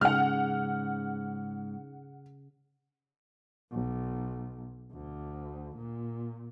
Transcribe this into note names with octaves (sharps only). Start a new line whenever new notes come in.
G#2 C#3 F#5 F6
B1
D2
A#2